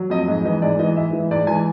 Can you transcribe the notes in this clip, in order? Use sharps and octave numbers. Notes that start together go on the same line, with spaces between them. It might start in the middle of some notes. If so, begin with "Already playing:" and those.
Already playing: F#3
F2 D#5
G#2 D#5
E3 D#5
G#2 D5
E3 D#5
G#2 E5
E3
G#2 D5
E3 G#5